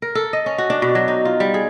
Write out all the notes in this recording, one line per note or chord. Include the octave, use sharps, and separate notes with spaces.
A#4
A4
D#5
C#4
F#4
D4
B2
F#3
D#4
F4
G3
G#4